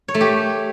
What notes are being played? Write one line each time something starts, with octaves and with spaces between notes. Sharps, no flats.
C#5
A3
G4